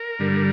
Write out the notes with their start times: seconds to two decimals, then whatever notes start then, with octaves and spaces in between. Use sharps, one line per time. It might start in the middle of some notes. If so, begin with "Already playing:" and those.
Already playing: A#4
0.19 G2 D3 G3